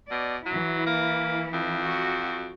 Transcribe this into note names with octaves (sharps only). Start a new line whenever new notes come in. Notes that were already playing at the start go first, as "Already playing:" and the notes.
B2 D5
E3 F#3 E4
A#3
F2
F#4